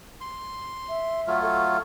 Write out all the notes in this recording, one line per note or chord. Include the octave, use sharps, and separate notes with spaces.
C6
E5
F#3 A3 F4
A4